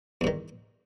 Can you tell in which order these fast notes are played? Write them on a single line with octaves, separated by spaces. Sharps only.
E2 G2 D#3